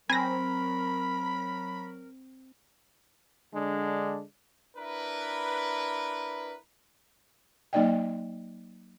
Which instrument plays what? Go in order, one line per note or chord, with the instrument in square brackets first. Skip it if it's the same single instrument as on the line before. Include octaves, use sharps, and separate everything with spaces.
[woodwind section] F#3 A#4 [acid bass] C4 [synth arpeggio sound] G#5 A#6 [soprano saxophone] B5
[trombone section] D3 G#3 D4
[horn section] D4 E4 A#4 B4
[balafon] F#3 A#3 D#4 D5 D#5 G5